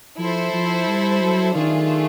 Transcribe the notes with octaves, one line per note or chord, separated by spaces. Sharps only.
F3 E4 A4 C5
F3
G3
F#3
D#3 A3 D4 F4 G#4